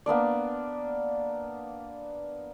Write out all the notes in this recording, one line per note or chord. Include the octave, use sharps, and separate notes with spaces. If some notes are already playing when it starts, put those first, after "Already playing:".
A#3 B3 D4 D5